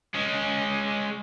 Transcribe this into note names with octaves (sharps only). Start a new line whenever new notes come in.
G#3 C#4